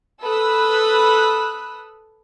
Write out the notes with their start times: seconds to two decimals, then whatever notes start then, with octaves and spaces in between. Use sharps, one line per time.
0.22 A4 B4 B5 D#6 E6 F#6